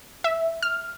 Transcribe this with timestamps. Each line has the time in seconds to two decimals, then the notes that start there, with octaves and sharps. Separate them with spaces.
0.24 E5
0.63 F6